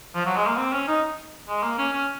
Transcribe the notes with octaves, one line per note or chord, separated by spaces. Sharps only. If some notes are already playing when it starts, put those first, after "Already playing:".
F3
F#3
G#3
A#3
C4
C#4
D#4
G#3
A#3
C#4
C#4